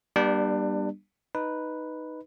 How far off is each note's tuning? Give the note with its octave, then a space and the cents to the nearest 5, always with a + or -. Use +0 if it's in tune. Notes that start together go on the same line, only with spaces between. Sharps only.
G3 +0 B3 -45 D4 +25
D#4 +0 B4 +0